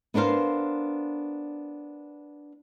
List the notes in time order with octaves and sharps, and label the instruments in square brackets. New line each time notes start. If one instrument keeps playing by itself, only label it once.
[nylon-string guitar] B3 D4 A#4 C5 F5